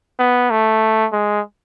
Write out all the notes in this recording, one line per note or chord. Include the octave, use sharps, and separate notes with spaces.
B3
A3
G#3